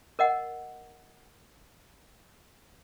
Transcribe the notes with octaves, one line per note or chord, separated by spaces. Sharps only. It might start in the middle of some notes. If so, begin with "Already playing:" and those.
A#4 D#5 F#5